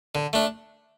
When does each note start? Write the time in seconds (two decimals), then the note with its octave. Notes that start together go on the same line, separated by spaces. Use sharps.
0.15 D3
0.33 A3 D4